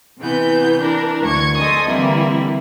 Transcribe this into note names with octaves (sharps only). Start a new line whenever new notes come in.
C3 E3 B3 G6
E3 D4 A#4
D2 C#6 G#6
A4 C5 D#5 G#5 D#6
D3 E3 G3 A#3 C4 E4